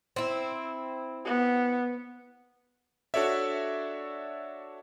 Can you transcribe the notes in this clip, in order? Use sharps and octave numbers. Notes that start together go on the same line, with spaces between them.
C4 E4
B3
D4 F#4 A4 C#5 D5 E5